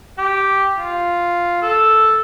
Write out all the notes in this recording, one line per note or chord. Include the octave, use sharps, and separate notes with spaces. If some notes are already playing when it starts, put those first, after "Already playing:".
G4
F4
A4